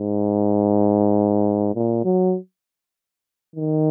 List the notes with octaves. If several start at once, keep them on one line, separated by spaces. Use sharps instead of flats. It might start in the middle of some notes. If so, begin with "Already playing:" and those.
Already playing: G#2
A#2
F#3
D#3